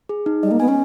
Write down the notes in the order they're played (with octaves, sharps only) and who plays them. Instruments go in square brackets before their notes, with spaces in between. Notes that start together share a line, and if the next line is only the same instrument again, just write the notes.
[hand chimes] G#4
D#4
[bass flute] G3 [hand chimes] D#5
[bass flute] A#3
[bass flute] B3 [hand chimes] G#5
[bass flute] C#4